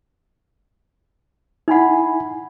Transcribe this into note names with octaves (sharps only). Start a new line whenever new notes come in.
D#4 E4 F#5 G#5 B5